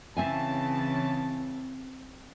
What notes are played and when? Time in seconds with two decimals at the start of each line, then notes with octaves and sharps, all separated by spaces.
0.17 C#3 E3 C4 E5 G#5 A5